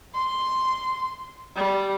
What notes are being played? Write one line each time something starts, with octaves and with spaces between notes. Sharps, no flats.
C6
G3